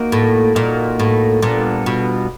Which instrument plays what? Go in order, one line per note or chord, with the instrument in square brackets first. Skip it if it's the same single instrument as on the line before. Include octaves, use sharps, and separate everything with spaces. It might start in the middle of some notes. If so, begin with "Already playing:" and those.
Already playing: [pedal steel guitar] A#3 D#4 F#4 A#4
[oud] A2
[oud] A#2 [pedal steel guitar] A#3 D#4 F#4 A#4
[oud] A2
[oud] A#2 [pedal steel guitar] G3 B3 D4 F4 A4
[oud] B2